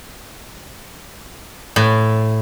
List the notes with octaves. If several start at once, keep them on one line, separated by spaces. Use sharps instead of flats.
A2